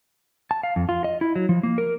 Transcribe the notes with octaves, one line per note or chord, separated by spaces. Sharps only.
A5
F5
F2
F4
D#5
E4
F#3
F3
A#3
A#4